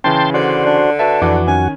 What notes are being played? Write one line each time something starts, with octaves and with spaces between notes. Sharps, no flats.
C#3 E3 C#4 G5 A5 C6
D3 F#4 C5 D5
D4
F#4 B4 E5 A5
F2 E3 D4 F#4 D6
D#3 C#4 G#5